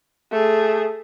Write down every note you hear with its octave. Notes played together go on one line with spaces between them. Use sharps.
A3 G#4